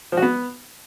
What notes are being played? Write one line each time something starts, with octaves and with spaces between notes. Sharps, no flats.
F3
F#4
B3